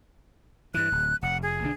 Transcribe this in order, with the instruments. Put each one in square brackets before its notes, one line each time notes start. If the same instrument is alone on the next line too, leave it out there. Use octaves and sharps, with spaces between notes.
[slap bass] G2 E3 [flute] F#6
[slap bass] D1
[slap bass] F1 [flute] F#5
[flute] G#4
[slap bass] B1 D3 D4